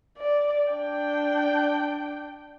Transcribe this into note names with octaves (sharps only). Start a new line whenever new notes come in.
D5
D4 G5